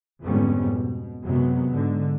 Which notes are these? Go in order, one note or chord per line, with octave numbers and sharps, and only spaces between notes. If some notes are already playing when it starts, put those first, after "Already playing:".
F2 G#2 D3 G3 B3 C#4
B2
F#2 C3 F#3 G#3 B3
G#2 D3